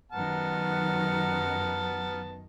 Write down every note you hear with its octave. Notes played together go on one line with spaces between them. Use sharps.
F#2 D#3 B3 F#5 A5 A#5 F6